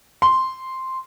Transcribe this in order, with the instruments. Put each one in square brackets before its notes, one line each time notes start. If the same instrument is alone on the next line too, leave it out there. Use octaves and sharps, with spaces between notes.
[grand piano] C6